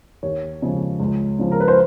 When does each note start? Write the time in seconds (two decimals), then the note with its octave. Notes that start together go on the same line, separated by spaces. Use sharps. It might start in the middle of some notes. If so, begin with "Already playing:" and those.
0.23 D#2 C#5
0.62 C#3 F3 G#3
1.00 C#2
1.39 C#3 F3
1.52 A#4
1.60 B4
1.68 C5